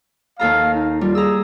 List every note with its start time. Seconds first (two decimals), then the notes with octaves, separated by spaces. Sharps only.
0.39 D#2 A4 F5 A#5
0.74 D#4
1.01 G3 F4
1.15 G#4 A#5 E6